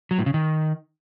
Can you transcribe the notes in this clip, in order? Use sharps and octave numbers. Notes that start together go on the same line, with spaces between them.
F#3
A2
C#3
D#3